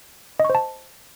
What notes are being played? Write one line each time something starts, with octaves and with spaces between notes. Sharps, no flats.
D#5
C#6
C5
A5